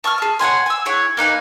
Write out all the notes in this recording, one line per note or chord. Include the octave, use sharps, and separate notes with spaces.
A5 C#6 E6 F6
G#4 A5
C#5 F#5 G#5 C6
G#5 E6
E4 G#4 C#5 F#5
A#3 D#4 B4 G#5